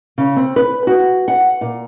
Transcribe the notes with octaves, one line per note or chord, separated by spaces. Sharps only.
C#3
C4
B4
F#4
F#5
A#2